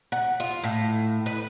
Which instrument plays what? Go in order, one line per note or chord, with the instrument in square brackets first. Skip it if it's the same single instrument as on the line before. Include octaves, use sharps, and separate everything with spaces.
[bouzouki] F#5
F4
A2
B4